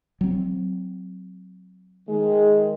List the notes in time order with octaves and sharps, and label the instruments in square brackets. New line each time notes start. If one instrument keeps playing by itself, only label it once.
[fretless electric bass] F#3 C4
[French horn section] D#3 G#3